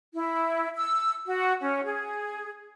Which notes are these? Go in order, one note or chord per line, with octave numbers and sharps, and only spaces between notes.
E4
E6
F#4
C#4
G#4